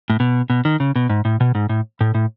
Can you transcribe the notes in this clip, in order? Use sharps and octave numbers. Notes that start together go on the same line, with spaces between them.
A2
B2
B2
D#3
C#3
B2
G#2
A2
B2
G#2
A2
A2
A2